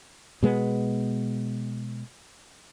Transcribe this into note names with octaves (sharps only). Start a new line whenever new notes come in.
B2 G#3 B3